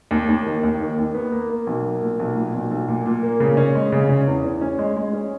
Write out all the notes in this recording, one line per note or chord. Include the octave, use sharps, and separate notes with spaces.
D#2
D#2
D#3
D#2
D#3
D#2
B3
A#3
A#3
B1
A#3
A#2
B1
A#2
B1
B1
A#2
A#2
A#3
C#3
C#4
G#3
C#3
C#4
E2
E2
C#4
G#3
G#3
C#4